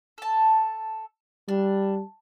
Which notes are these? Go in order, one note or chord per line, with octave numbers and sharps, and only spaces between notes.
A4 A5
G3 D4